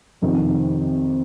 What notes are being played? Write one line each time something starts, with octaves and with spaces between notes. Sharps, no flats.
F2 C3 D#3